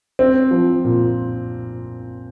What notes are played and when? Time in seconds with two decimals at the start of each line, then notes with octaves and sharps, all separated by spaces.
0.19 C4
0.51 F3
0.85 A#2